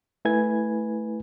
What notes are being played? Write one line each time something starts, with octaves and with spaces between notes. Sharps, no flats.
A3 E4 B4 G#5 G#6